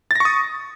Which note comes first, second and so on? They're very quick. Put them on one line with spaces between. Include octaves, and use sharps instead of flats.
A6 A#6 C#6 D#6